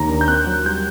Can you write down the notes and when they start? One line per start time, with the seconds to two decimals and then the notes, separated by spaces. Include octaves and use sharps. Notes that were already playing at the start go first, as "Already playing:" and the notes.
Already playing: D#2 D#3 A#5
0.09 D4
0.21 G6
0.28 C4 F#6
0.46 F#3
0.65 G3 G6